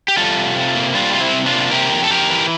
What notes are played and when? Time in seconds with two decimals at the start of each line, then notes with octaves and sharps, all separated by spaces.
0.08 G4
0.17 G3 F4 A4
0.37 C3
0.56 C3
0.75 A#3
0.95 G3 D4 F4
1.13 C3 F4
1.20 C4 E4
1.33 C3
1.46 D4 F4
1.53 A#3
1.71 C3 G4 A#4
1.91 F2
2.04 A4
2.10 F2 G4 A#4
2.30 E3